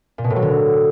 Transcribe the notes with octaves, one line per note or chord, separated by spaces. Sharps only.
A#2
B2
A2
F#3
D3